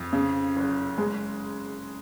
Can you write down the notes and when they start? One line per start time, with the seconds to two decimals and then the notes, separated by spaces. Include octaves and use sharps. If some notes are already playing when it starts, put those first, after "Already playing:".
Already playing: F2
0.13 C#3
0.56 F#1
0.98 G#3